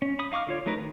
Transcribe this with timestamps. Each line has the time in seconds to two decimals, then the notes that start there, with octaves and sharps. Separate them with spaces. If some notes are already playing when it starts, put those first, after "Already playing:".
0.02 C#4
0.19 B5 D#6
0.32 D#4 F5 C#6 D6 F6
0.47 D3 F4 C#5
0.66 F#3 A3 D#4 A#4 B4
0.78 D#3